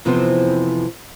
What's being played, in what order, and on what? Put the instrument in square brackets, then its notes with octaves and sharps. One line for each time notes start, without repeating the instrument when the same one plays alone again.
[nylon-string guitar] F2 C3 E3 F3 B3 C4